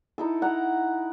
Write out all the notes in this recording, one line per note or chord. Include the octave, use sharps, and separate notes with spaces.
D#4 E4 A4
F#5 A#5